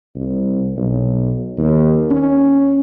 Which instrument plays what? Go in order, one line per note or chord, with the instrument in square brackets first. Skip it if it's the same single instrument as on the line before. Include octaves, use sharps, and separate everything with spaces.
[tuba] C2
B1
D#2
C#4